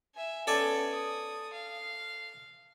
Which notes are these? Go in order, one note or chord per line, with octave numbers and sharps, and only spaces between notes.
E5 G#5
B3 C#4 A4 D5 G#5
D#6
F5